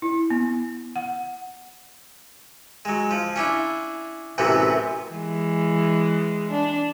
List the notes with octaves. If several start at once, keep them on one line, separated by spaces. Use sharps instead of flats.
E4
B3
F#5
F#3 G#3
F3
C#4 D4 E4
A1 F#2 C3 E3 B3
E3 G#3
D4